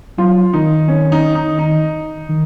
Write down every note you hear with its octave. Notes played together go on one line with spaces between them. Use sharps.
F#3 F4
D#3 D#4
C#4
D#4
D#4
D#4
D#3